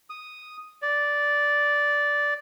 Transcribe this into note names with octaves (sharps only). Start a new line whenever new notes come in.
D#6
D5